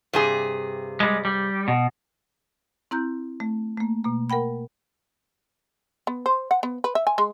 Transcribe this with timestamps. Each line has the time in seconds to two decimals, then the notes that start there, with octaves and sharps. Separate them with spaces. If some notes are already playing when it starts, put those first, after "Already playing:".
0.13 G2 C3 G#4
1.00 G3 G#3
1.25 G3
1.68 B2
2.91 C4 E4 A#5 F#6 G6
3.40 A3
3.78 A3 A#3
4.04 B2 A#3
4.30 A#4 F#5 G5 B5
6.07 B3
6.26 C5
6.51 F#5
6.63 B3
6.84 B4
6.95 E5
7.07 G#5
7.18 G#3